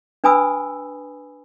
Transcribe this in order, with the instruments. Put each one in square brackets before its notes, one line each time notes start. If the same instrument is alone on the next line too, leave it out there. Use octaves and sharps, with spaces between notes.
[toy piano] D4 B4 G#5 B5 D#6 E6